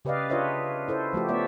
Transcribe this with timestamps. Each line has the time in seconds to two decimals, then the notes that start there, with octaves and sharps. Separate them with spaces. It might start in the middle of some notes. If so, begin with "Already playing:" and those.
0.05 C#3 G4 B4 D5 D#5 F5
0.29 D4 F4 B4 C#5 D#5 E5
0.88 E4 A4 C5
1.13 F3 A3 F#4 G4
1.29 A3 B3 C#5 D5 E5